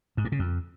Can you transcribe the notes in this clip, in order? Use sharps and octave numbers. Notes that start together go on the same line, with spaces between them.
G#2
G2
C#3
F2